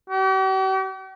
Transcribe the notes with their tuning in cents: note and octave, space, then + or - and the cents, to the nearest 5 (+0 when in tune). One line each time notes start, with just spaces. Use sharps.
G4 -45